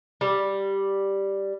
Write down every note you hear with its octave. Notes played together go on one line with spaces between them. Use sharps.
G3